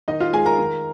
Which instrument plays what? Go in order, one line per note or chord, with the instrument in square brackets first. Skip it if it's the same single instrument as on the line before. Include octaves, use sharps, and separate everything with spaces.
[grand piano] D#3 D#4 D#5
F4 F5
G#3 G#4 G#5
A#4 A#5
D#3